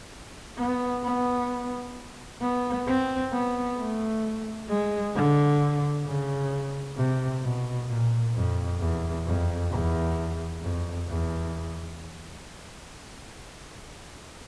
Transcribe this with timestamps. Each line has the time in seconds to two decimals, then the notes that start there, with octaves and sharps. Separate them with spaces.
0.58 B3
1.04 B3
2.41 B3
2.87 C4
3.33 B3
3.78 A3
4.69 G#3
5.15 D3
6.06 C#3
6.97 C3
7.43 B2
7.89 A#2
8.34 F2
8.80 E2
9.26 F2
9.71 E2
10.62 F2
11.08 E2